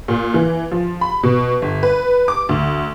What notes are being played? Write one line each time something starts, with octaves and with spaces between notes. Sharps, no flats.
A#2
E3
F3
B5
B2
G1
B4
D6
D2